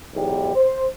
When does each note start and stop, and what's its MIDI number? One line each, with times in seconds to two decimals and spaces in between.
0.14 0.52 35
0.14 0.52 40
0.14 0.52 44
0.14 0.52 67
0.55 0.85 72